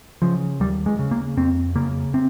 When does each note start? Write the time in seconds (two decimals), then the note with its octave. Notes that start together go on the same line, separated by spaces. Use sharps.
0.22 C#3 F3
0.60 D#2 G3
0.86 G#3
0.99 C#3
1.11 A#3
1.37 F2 C4
1.75 C#3 A#3
2.14 C4